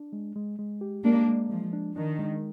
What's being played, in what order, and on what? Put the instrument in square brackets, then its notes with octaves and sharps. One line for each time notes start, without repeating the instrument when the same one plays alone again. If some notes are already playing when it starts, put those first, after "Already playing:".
Already playing: [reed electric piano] D4
G#3
G#3
G#3
G4
[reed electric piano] G#3 [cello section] A#3 D4
[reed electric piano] G#3
[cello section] F3 [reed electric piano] G#3
[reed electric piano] D4
[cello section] D#3 [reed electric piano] D4
[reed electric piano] G#3